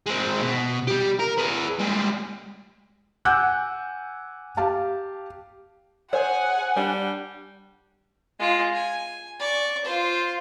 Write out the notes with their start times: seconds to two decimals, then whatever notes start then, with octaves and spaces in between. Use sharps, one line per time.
0.06 G#3 C4
0.41 B2
0.87 G3 G4
1.20 A#4
1.38 G#4 B4
1.79 G3 G#3
3.25 F#5 G#5 D6 E6 F#6 G6
4.57 G4 F5 A5
6.13 G#4 C5 C#5 F#5 G#5
6.77 G3 D4
8.39 G#3 F4
8.74 G#5
9.40 D5 C#6
9.85 F4 C5